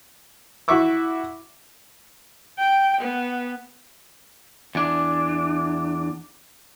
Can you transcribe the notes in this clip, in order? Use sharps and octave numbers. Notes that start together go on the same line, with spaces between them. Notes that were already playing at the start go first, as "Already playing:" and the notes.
E4 F#4 E5 C#6 D6 E6
G5
B3
E2 D4